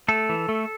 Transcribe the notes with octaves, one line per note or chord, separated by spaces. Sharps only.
A3 A4
E3
A3